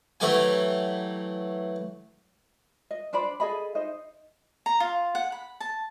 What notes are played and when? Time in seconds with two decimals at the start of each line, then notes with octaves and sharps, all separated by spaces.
0.20 E3 F#3 A3 G4 G5 G#5
2.91 D#5
3.13 D4 C5 D5 B5
3.40 G#4 A4 D#5 B5
3.75 D#4 C5 D#5
4.66 A#5
4.80 F4
5.15 F#5
5.32 B5
5.60 A5